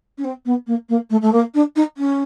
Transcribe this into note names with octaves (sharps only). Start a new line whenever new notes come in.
C#4
C4
B3
A#3
A#3
A3
A3
A#3
D4
D#4
C#4